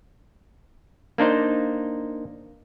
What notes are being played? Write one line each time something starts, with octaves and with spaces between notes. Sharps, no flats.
A#3 D4 D#4 C5